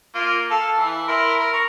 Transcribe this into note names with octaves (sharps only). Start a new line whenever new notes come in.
A#3 F4
A4 F5 A5
E3
E4 A#4 C6
A#4
A#5 C#6